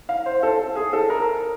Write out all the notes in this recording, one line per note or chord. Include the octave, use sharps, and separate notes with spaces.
F5
C5
A4
G#4
A4
A#4